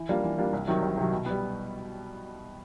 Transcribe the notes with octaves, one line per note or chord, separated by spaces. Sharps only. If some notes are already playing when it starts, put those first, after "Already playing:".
Already playing: E3
G3 A#3 D4 F4
E3
G3 A#3 D4 F4
C2
C3 D#3 F#3
C2
C3 D#3 F#3
B2
G3 B3